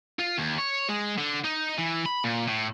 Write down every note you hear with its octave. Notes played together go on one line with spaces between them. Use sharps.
F4
D#2
C#5
G#3
D3
D#4
E3
B5
A#2
A2